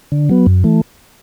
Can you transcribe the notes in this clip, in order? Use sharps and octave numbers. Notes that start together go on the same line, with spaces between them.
D3
F#3 B3
F#2
E3 A3